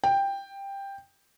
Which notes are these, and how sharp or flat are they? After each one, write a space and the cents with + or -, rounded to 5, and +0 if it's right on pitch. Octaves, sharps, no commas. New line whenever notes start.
G5 +10